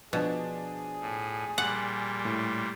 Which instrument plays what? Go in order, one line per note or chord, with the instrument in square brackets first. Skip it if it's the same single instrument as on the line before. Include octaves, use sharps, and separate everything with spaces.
[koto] B2 [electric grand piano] F3 D4 [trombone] G#4
[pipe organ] A2
[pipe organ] A#2 G3 [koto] F#5
[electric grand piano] A2